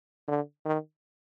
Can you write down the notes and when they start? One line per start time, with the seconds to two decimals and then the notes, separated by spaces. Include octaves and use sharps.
0.28 D3
0.65 D#3